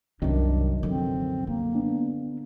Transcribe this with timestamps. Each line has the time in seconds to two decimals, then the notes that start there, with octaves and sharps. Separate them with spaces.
0.22 C2 F#2 D#3 C4 D4
0.83 D3 F3 C4
1.47 D3 A#3
1.75 B3 D4